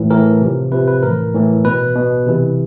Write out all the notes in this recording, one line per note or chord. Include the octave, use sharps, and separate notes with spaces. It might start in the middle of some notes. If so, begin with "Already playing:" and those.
Already playing: A2 E3
A2 E3 A#4
C3 F3
C3 F3 B4
B4
A2 E3 A#4
A2 E3
B2 B4
B2
C3 E3